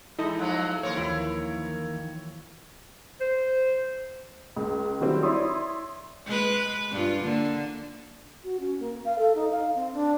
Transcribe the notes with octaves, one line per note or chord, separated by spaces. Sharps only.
E3 G#3 D#4 E4 A4 D#5
F3 F#3 A#3
D#3 E3 A#3 A#4 C5 C#5
D#2 E3 F3 E4
C5
C#2
D#3 F#3 G3 C4 E4
E4 C#5 D5 C6 D#6
G#3 B4
G2 F4
D3 A#3
F#4
C#4
A#3
F5
A4
D#4
F5
C4
D4